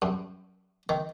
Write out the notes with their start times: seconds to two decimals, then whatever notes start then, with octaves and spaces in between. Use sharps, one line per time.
0.02 F#2
0.89 D#3